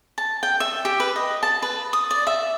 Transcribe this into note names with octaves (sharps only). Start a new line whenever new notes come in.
A5
G5
E5
G4
B4
D#5
A5
B4
D#6
D5
E5